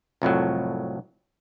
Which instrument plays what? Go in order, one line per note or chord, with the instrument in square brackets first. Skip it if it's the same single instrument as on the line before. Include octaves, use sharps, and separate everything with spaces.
[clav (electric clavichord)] C2 F2 A2 F#3